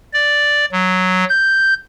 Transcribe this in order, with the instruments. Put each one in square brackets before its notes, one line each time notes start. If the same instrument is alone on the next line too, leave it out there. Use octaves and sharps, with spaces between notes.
[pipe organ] D5
F#3
G6